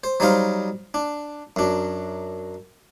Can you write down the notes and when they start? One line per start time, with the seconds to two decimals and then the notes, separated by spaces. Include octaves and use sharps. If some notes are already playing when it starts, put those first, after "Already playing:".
0.04 C5
0.20 F#3 G3 D#4 C5 F5
0.94 D4
1.56 F#2 D4